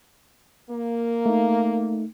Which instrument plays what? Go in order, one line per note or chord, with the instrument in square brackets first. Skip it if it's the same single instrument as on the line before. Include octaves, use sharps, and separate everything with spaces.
[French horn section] A#3
[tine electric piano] A3 D#4